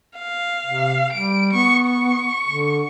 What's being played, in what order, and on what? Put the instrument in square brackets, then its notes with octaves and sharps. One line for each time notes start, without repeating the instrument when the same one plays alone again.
[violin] F5
[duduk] C3
[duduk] G3 [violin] D7
[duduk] B3 [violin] C#6
[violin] C#6
[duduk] D3